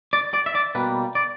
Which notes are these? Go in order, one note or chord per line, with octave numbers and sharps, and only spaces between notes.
D5
D5
E5
D5
B2 G3 A#3 B4
D5